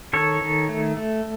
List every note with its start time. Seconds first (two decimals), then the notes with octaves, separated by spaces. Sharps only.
0.13 D#3 A4 C#5
0.41 D#3
0.69 A3
0.97 A3